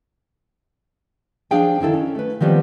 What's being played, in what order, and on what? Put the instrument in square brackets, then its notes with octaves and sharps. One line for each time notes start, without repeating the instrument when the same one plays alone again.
[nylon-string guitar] F3 D4 G#4 F5 G5 G#5
D3 D#3 E4 A4
C#4
A3 B4
D#3 F3 G3 B3 C4